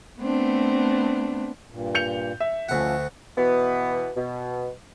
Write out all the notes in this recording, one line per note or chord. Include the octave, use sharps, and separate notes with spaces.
A3 B3 C4 D4
G2 A#2
G6 C#7 F7
E5
D2 F3 A3 C#4 F#5
B2 E3 B3
B2